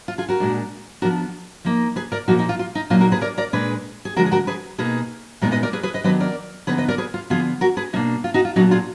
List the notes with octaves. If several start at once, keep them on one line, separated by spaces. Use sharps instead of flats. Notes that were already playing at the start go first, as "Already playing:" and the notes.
F4
F4 G#4
F#4 A#4
A#2 G#3 D4
F3 B3 D4 F#4 A#4
F3 A#3 D#4
G#4 B4
A#4 D5
A#2 F3 A#3 D#4 F#4
D#4
F4
F4
D#4
A#2 F#3 A#3 D#4 F4
F#4 A#4
G#4 B4
A#4 D5
A#4 D5
A#2 G#3 D4 G#4 B4
G#4
D3 F3 G#3 F#4 A#4
G#4
F#4 A#4
G#4 B4
B2 A#3 D#4 G#4 B4
A#2 G#3 B3 D#4 A#4 D5
B4 D#5
A#4 D5
G#4 B4
G#4 B4
B4 D#5
D#3 F#3 B3 D4 B4 D#5
A#4 D5
D3 F3 B3 D#4 G#4 B4
B4 D#5
A#4 D5
G#4 B4
F4
D3 F3 B3 F4 G#4
F#4 A#4
G#4 B4
B2 A#3 D4 D#4
F4
D#4 F#4
F4
A#2 F#3 B3 D4 D#4 F#4
F4 G#4